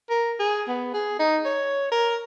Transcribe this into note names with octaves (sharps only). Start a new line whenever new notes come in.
A#4
G#4
B3
G#4
D#4
C#5
A#4